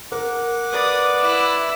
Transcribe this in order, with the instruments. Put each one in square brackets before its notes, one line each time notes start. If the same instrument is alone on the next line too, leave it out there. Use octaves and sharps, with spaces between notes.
[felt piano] A#4 [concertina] F#5 D6
[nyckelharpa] B4 D5 [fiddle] D#6
[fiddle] E4 E5